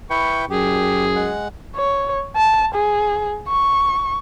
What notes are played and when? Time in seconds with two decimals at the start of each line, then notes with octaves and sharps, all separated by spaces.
0.10 E4 B4 G5 C#6
0.50 F#2 G4 G#4
1.16 G#3 F#5
1.76 C#5
2.36 A5
2.74 G#4
3.48 C#6